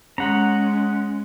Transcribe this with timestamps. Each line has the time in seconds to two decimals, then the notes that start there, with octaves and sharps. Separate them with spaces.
0.18 G#3 C#4 F#5 A#5